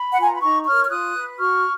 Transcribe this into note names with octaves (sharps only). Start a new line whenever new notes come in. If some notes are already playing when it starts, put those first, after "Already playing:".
Already playing: B5
F#5
F4 B4 G#5
A#5
B5
D#4 A#5 C#6
A#4 C#5 C#6 F6
F6
F4 D#6 F#6
B4
F#4 C#6 F6